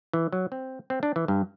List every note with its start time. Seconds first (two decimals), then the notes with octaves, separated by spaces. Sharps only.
0.13 E3
0.32 F#3
0.52 C4
0.90 C4
1.03 D4
1.16 E3
1.28 G2